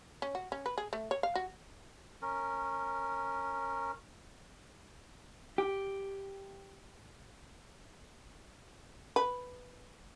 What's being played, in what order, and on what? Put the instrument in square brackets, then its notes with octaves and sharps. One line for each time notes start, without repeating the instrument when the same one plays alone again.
[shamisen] C#4
F#4
C#4
B4
G#4
A3
C#5
F5
F#4
[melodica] C#4 A#4
[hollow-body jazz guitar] G4
[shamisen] B4